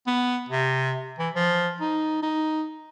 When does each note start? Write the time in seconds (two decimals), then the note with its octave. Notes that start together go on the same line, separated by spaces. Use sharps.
0.07 B3
0.49 C3
1.19 E3
1.35 F3
1.80 D#4
2.23 D#4